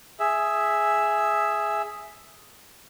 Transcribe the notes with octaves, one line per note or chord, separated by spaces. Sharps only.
G#4 E5